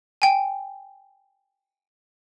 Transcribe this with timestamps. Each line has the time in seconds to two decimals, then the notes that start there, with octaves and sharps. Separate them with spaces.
0.22 G5 G#5